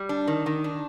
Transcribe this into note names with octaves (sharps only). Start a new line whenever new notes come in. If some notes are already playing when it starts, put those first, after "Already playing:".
Already playing: G3
D4
D#3
D#3
D4